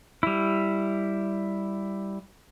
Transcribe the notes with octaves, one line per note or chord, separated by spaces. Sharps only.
G3 E4